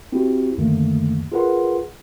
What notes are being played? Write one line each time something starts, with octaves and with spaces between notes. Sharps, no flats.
C4 E4 F#4 G4
C#2 F#2 D3 D#3 A3 A#3
F4 G#4 A#4 B4 F#5 C6